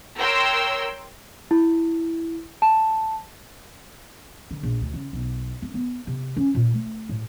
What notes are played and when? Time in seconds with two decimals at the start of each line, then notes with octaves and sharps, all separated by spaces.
0.18 A#4 C#5 G5 C6 E6
1.51 E4
2.62 A5
4.51 D3
4.63 A#1
4.81 D2
4.94 C#3
5.13 B1
5.62 C4
5.74 B3
6.07 C3
6.37 C#4
6.55 A#2
6.74 A3
7.09 A2